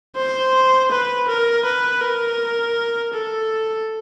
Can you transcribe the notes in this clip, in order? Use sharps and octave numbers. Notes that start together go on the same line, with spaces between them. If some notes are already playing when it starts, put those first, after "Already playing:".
C5
B4
A#4
B4
A#4
A4